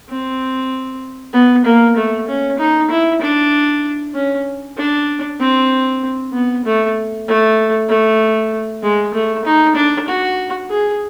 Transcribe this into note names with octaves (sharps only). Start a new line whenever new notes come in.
C4
B3
A#3
A3
C#4
D#4
E4
D4
C#4
D4
C4
B3
A3
A3
A3
G#3
A3
D#4
D4
F#4
G#4